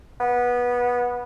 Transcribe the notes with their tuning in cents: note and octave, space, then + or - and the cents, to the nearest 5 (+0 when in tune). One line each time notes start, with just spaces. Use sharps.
B3 -15